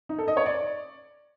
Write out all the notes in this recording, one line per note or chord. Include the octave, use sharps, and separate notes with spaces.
D#4
A4
D#5
C#5
D5